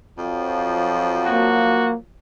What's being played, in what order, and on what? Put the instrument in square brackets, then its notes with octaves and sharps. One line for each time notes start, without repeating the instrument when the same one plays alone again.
[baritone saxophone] F2 [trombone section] F3 F#3
[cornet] A#3 [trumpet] F#4